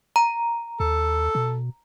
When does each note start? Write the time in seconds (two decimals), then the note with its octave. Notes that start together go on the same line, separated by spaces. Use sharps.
0.16 A#5
0.80 D#2 A4
1.35 B2